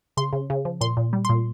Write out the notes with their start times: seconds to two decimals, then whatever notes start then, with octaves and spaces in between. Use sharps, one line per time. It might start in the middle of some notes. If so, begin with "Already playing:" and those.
0.17 C#3 C6
0.33 C#3
0.50 C#3
0.65 F3
0.81 A#2 C6
0.97 A#2
1.13 G3
1.25 C6
1.29 A#2